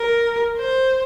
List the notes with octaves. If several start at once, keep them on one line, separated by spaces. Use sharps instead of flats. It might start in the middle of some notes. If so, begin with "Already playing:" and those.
Already playing: A#4
C5